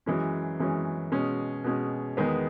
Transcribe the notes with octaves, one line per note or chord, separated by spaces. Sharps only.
F#2 E3 G#3 C#4
F#2 E3 G#3 C#4
B2 G#3 C#4
B2 G#3 C#4
E2 D#3 G#3 B3